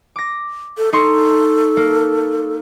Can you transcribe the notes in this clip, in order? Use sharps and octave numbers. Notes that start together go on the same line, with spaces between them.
D6 A#6
A4
D#4 A4 C6 C#6
A#3